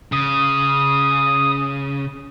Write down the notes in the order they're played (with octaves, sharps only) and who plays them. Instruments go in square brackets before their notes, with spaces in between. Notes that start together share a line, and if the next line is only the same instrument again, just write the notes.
[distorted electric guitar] C#3 [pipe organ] D#6